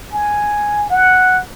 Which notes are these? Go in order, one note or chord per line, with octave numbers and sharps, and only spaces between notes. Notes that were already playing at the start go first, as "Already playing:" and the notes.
G#5
F#5